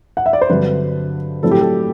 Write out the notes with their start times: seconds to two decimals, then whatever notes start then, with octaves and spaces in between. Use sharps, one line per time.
0.17 F#5
0.26 E5
0.33 D5
0.41 C5
0.49 G2 D3 F#3 C4 B4
1.43 A2 F#3 C4 E4 A4
1.51 G4
1.61 A4